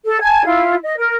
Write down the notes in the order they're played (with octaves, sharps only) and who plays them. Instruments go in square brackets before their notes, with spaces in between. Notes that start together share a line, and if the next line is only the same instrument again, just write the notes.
[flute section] A4
G#5 A5 G#6
E4 F4
D#5
A#4